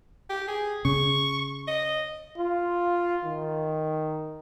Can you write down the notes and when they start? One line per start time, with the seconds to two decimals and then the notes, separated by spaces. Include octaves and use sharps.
0.30 G4
0.48 G#4
0.85 C#3 C#6
1.67 D#5
2.38 F4
3.25 D#3